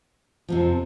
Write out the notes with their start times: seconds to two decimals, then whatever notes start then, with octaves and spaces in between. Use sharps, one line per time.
0.48 F2 C3 F3